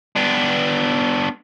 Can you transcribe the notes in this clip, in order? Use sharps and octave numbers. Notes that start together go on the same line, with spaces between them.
B3 D4